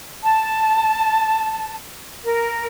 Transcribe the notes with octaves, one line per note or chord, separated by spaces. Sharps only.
A5
A#4